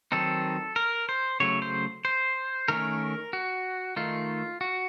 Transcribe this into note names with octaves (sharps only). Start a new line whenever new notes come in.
D#3 F#3 C4 D#4 A4
A#4
C5
C#3 F#3 A3 C#5
C5
C5
D#3 A3 C#4 A#4
F#4
D#3 A3 D#4 F4
F#4